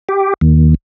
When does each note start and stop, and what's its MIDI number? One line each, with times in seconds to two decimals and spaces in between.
0.09 0.34 67
0.41 0.74 39